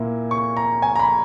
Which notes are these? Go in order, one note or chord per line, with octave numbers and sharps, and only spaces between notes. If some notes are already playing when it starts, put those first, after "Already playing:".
Already playing: A#2 A#3 E4
C#6
A#5
G#5
A#5
B5